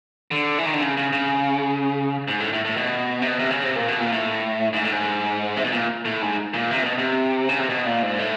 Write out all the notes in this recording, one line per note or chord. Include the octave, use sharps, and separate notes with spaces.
D3
E3
D#3
D3
C#3
C#3
C#3
G#2
A2
A2
A2
B2
C3
B2
C3
C#3
C3
A#2
B2
A#2
A2
G#2
A2
G#2
C3
B2
A#2
A2
G#2
A#2
C3
B2
C3
C#3
C3
B2
A#2
G#2
A2